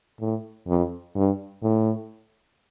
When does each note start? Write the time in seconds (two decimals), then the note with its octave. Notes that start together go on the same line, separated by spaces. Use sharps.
0.20 A2
0.68 F2
1.15 G2
1.63 A2